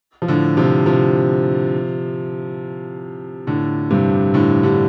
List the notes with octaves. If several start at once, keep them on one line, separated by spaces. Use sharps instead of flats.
F3
A2 D3
C3 F3
C3 F3
A2 D3
G2 C3
A2 D3
D3 G3